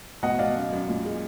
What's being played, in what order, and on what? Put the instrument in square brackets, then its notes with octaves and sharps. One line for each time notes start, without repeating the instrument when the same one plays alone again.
[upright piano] B2 D#5 F#5
B2 D5 F5
F#2
F#2
A#2
G#3